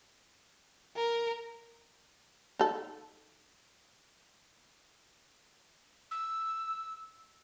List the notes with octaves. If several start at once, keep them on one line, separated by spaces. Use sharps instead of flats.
A#4
D#4 A4
E6